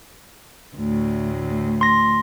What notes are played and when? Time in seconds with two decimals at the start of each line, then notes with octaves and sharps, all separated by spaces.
0.77 D2 A2
1.81 C6 A#6